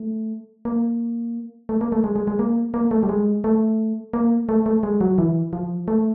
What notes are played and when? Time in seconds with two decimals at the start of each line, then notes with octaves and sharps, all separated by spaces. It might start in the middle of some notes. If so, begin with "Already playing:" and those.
Already playing: A3
0.65 A#3
1.69 A3
1.81 A#3
1.92 A3
2.04 G#3
2.16 G#3
2.27 G#3
2.39 A#3
2.74 A#3
2.91 A3
3.03 G3
3.09 G#3
3.44 A3
4.13 A#3
4.49 A3
4.66 A3
4.83 G#3
5.01 F#3
5.18 E3
5.53 F3
5.88 A3